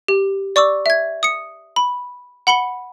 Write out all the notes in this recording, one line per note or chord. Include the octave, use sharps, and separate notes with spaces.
G4
D5 C#6 D6 E6
E5 G#6
D#6 C#7
B5
F#5 B5 C#7 G7